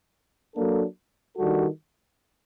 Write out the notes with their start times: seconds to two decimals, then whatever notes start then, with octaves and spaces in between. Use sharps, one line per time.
0.54 F#3 A#3 D4 A4
1.37 D#3 G3 D4 F#4 A4